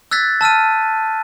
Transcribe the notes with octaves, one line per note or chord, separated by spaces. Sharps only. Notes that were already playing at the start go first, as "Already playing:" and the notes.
E6 F#6 G#6 A6 B6
A5 E6 F6 D#7